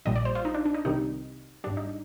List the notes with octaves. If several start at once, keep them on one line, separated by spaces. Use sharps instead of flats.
A#1 A#2 G3 D#5
D5
C5
F4
D#4
D4
D4
D#4
C2 C3 D#3 G3 D#4
G#1 G#2 G3 D4
D#4